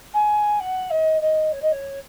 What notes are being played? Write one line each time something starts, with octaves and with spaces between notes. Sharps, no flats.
G#5
F#5
D#5
D#5
C#5
D#5
C#5